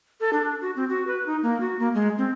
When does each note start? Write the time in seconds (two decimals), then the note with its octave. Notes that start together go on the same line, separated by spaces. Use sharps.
0.20 A4
0.33 D4
0.61 F#4
0.76 C4
0.90 F#4
1.07 B4
1.26 D#4
1.43 A#3
1.60 F#4
1.79 A#3
1.94 G#3
2.18 C4